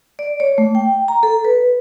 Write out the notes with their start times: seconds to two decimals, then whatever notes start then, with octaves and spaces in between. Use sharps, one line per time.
0.19 D5
0.40 C#5
0.58 A3
0.75 G5
1.08 A#5
1.23 A4
1.45 B4